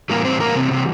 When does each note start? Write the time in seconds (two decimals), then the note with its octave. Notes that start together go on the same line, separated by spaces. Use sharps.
0.10 A2 E3 G3 A#3 A#4
0.25 C4 C5
0.40 A#3 A#4
0.55 C3 C4
0.71 C3 C4